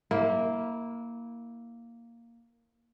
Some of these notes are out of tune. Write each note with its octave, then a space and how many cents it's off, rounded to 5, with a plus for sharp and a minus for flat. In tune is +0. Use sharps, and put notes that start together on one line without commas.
A#3 +0 E4 -20